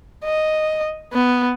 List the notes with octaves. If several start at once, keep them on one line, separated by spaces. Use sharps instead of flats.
D#5
B3